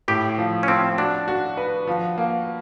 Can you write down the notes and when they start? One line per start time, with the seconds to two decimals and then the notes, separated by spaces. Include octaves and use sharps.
0.08 A2 G4
0.38 F3
0.63 C#4
0.68 F3 C4
0.98 D4 F#4
1.28 F#4
1.57 B4
1.87 F3
2.18 A#3